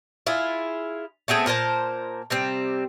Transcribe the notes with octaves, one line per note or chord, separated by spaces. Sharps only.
E4 F4 G#4
A3 B3 C4 G#4
A#2 A#4 C5 A5
C3 G3 C4